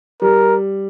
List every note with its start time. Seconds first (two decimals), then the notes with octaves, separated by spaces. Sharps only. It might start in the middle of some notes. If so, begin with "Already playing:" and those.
0.22 G3 A#4